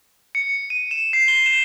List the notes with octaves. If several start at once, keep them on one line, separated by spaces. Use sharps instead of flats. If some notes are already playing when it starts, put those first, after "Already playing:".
C#7
D#7
E7
C7
G7
E7